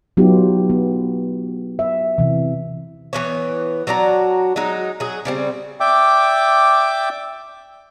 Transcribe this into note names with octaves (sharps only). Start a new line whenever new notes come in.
F#3 B3 D#4 F4 G4
B3
E5
C3 E3
E3 B3 C#5
F#3 D4 F#4 A#5
F#3 G#3 D#4
F#3 G#4
C#3 G3 C4
D5 E5 G5 D6